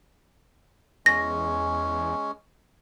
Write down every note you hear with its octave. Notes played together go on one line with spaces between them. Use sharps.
E2 G#3 C#4 A#6